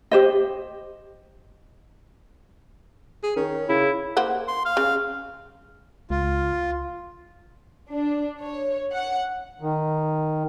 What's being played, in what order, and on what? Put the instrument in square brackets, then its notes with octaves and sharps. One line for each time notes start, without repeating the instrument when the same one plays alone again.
[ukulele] G4 C5 D#5
[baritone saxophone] G#4
[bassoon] D#3 [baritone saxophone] C#4
[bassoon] C#3 [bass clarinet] E4
[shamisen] A#3 C5 F#5
[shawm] C6
F5
[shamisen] C#3
[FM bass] C#2 [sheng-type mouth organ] F4
[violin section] D4
C#5
F#5
[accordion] D#3